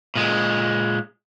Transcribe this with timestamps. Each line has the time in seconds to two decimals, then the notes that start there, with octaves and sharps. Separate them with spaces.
0.15 A#2 G#3